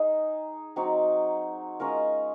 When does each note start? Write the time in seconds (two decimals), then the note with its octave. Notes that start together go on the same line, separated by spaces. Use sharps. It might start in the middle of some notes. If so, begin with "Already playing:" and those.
Already playing: D#4 G#4
0.76 F#3 C4 D#4 F#4
1.80 G#3 C#4 F4 A#4